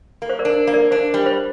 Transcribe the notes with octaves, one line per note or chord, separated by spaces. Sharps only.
A#3
C5
A#4 D5
D4
A#3
A#4 D5
D4 C5
G3
C5